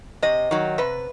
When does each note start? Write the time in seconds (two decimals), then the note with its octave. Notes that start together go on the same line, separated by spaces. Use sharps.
0.22 C3 D#5
0.51 D#3 F#3
0.78 C3 B4